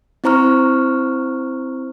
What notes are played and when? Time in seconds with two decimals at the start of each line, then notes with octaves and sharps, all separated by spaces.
0.24 C4 E4 C5 A#5 C#6 F6